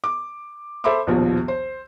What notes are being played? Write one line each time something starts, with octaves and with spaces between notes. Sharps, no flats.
D6
A4 C5 E5 B5 C6 D6
A#1 D#2 B2 F3
C5